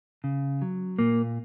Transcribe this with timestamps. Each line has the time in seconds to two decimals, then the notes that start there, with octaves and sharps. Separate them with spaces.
0.24 C#3
0.62 F#3
0.99 A#2 A#3